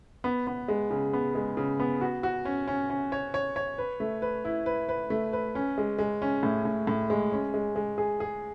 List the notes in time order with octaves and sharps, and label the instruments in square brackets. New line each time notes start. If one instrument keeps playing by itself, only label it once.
[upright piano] B3
B3
G#3
C#3
B3
G#3
C#3
B3
F#4
F#4
C#4
C#4
C#4
C#5
C#5
C#5
B4
A3
B4
E4
B4
B4
A3
B4
C#4
G#3
G#3
C#4
A2
A2
A2
G#3
C#4
G#3
G#3
G#4
G#4